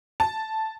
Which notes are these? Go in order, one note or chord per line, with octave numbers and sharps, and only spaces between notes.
A5